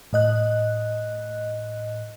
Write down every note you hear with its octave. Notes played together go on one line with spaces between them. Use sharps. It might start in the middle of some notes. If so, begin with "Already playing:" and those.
A2 D#5 F#6